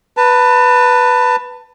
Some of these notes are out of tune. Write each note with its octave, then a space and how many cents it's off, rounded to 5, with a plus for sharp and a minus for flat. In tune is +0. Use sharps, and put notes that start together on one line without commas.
B4 +0 A5 +30